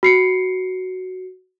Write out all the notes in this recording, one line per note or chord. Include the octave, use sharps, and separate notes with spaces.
F#4 C7 C#7